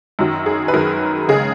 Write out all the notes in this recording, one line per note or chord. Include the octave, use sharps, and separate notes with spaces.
F#2 D#3 F#3
G#4
B4
F#2 D#3 F#3 A#4
C#2 C#3 G#3 G#4